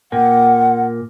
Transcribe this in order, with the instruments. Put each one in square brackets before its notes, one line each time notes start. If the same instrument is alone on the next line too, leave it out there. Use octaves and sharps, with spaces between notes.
[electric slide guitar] A#2 A#4 G5 [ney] F#5